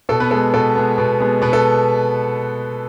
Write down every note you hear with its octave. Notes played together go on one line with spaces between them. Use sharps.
B2 A4
B3 B4
G#3 B3 A4
B2 A4
G#3 B3
B2
G#3 B3
B2 B3 B4
A4